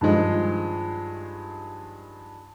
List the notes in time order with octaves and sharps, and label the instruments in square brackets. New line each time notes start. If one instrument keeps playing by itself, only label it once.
[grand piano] G2 D#3 F3 G#3